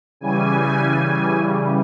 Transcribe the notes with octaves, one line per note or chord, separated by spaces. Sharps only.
C#3 E3 G3 G#5